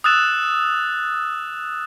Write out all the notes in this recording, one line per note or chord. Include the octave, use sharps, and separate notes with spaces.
D#6 E6 F#6 A6 E7